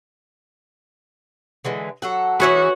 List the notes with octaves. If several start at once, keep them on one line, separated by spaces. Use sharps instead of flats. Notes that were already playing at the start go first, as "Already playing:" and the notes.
D3 E3 G#3
F#3 A4 F#5
E3 C#4 F#4 G#4 B4 C#5 E5